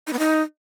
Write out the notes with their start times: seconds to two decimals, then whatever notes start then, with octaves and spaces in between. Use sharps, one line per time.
0.07 D#4
0.13 B3
0.19 D#4